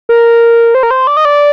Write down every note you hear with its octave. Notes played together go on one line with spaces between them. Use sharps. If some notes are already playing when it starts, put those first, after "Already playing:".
A#4
C5
A#4
C5
D5
D#5
D5